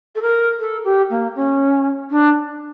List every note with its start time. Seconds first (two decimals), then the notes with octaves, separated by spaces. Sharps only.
0.15 A4
0.22 A#4
0.60 A4
0.84 G4
1.10 A#3
1.35 C#4
2.11 D4